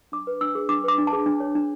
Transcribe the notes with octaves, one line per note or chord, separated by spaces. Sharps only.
D4 D6
B4
D4 E6
G#4
D4 D6
B4 D6
D4
A5
G#4
D4
C#5
D4